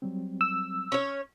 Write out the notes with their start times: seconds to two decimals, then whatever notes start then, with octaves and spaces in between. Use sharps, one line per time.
0.02 F#3 G3 C4
0.41 E6
0.92 C#4 C#5